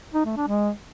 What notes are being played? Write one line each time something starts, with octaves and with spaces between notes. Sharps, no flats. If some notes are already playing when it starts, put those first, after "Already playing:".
D#4
A3
D4
G#3